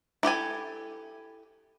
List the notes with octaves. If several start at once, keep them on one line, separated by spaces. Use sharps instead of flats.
E4 G4 A4 G#5